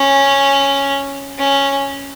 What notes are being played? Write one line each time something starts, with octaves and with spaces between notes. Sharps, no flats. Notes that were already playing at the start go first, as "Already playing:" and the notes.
Already playing: C#4
C#4